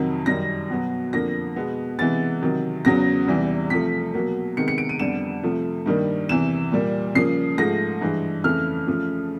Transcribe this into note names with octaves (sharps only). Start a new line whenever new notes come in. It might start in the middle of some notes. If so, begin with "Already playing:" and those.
Already playing: F2 C3 D#3 F#3
F#2 D#3 G3 A#6
B2 F#3 B3
F2 D3 F3 A#3 A#6
B2 G#3 B3
C3 E3 G#3 B3 A6
C3 D#3 F#3
E2 C#3 F#3 B3 A#6
E2 C3 E3 G3
C3 F3 A3 B6
B2 F#3 A#3
C3 D#3 G#3 B3 C#7
C#7
D7
D#7
F2 D3 G3 B3 E7
C3 F3 A3
G2 D#3 G3 A#3
E2 C3 E3 E7
A#2 G3 A#3
C#3 F3 A#3 C7
G#2 F3 A3 A#6
G2 E3 G#3
F2 C#3 E3 A3 F6
C#3 F3 A3